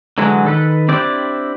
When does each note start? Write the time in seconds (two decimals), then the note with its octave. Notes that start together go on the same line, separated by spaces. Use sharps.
0.18 D3 E3 F#3 G#3
0.45 D#3 A4 B4
0.88 C4 D4 E4 G4 D5